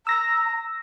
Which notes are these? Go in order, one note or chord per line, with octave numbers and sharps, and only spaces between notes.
A#5 E6 A#6